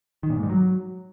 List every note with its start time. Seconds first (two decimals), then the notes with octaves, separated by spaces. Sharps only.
0.23 D#3
0.30 A#2
0.36 G#2
0.43 G3
0.50 F#3